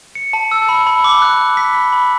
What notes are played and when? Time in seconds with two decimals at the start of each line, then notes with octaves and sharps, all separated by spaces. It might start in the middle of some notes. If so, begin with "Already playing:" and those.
0.15 C#7
0.33 A5
0.52 E6
0.69 B5
0.87 B5
1.04 D6
1.22 F#6
1.39 F#6
1.57 B6
1.75 B5
1.93 B5